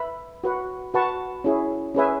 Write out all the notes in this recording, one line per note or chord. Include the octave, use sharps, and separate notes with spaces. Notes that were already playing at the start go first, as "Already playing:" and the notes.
Already playing: B4 E5 B5
F#4 B4 F#5
F#4 B4 F#5 A5 C#6
C#4 E4 G#4
C#4 G#4 B4 E5 G#5